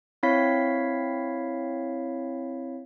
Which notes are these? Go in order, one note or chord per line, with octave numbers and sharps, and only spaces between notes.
C4 E4 C#5 F5 B6